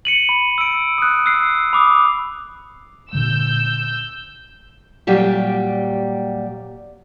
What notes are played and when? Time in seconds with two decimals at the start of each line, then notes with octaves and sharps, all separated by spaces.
0.05 C#7 D#7 F#7
0.29 B5
0.58 E6 D7
0.98 D#6 F#6
1.26 E6 C7
1.73 B5 D6 D#6
3.13 A#2 D3 G#3 E6 G6
5.07 A#2 F#3 G3 G4 G5